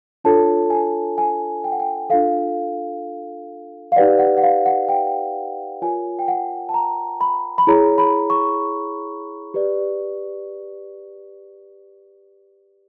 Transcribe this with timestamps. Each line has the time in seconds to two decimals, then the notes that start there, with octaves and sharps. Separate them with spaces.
0.24 D4 F4 A4 C#5 A5
0.70 G#5
1.18 G#5
1.64 G5
1.72 F#5
1.80 G5
2.10 D4 F4 A4 F5
3.92 F5
3.96 D#4 G4 B4 D5 F#5
4.19 F#5
4.37 F#5
4.43 F5
4.66 F#5
4.89 G5
5.82 F4 A#4 C#5 G#5
6.19 G5
6.28 F#5
6.69 A5
6.74 A#5
7.21 B5
7.58 B5
7.67 E4 G#4 C#5 A#5
7.98 B5
8.30 C#6
9.54 G4 B4 D5